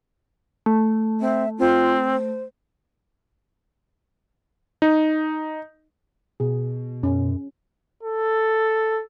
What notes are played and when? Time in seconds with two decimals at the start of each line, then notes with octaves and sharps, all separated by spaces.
0.66 A3
1.21 C4 E5
1.59 C4 F4
2.10 C5
4.82 D#4
6.40 B2 G#4
7.03 F#2 C#4
8.03 A4